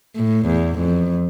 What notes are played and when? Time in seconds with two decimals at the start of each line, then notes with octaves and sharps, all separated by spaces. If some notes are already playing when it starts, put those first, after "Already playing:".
0.16 A2
0.46 E2
0.78 F2